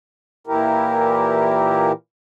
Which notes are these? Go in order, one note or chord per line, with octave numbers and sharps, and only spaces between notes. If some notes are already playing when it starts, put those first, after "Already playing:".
A#2 E3 E4 G4 A#4